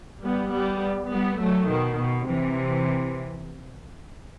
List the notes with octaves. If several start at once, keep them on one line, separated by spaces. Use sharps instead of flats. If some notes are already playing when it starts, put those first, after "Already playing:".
G3 B3
G3 B3
G3 B3
F#3 A3
B2 D#3
B2
C3 E3